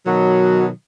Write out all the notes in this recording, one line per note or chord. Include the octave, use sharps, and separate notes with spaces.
B2 D#3 F#3